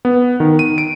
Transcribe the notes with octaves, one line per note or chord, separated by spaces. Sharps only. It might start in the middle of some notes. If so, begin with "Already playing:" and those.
B3
D#3
D#7
D7